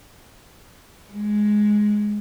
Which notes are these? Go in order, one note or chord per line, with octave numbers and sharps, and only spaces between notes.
G#3